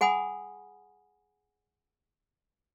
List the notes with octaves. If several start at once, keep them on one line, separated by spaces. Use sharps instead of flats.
G#4 F#5 G#5 B5 D#6